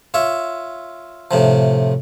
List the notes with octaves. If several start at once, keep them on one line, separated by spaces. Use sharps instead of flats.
F4 C#5 E5
A2 C3 F3